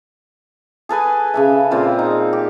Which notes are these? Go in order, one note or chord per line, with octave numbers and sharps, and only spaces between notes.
G#4 A4 B4 G#5
C#3 A4 E5
A#2 C4 F4
D#4
G4